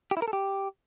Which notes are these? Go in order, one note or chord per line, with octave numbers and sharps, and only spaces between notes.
G4
E4
A#4
A4
G4